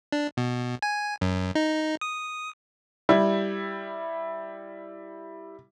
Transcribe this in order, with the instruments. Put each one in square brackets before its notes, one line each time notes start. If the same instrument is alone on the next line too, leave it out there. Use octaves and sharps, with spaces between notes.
[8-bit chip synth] D4
B2
G#5
F#2
D#4
D#6
[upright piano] G3 E4